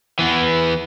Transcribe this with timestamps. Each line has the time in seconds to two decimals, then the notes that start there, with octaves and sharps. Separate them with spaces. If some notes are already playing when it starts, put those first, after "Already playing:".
0.19 E3 B3